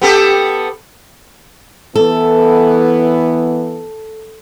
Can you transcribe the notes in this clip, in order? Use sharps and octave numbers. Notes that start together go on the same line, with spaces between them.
B3 G4 A4
E3 B3 A4